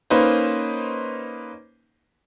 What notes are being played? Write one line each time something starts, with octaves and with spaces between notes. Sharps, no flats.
A#3 C#4 D#4 B4 C5